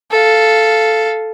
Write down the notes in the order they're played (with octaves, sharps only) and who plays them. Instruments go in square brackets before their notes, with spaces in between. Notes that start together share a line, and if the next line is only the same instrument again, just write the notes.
[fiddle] A4 F5